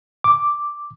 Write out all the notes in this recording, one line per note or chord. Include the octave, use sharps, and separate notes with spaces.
D6